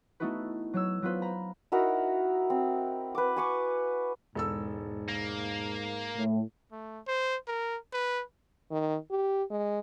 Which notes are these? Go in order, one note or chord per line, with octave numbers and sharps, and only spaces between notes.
A3 B3 D#4 E4 F#4 B4
F#3 C#5 E6
F#3 B3 F4 B4 C5
A#5 B5
D#4 E4 F#4 A#4
C4
B4 D6
G#5 C#6 D6
E1 G#2 A4 E6
A#3
A2
A3
C5
A#4
B4
D#3
G4
G#3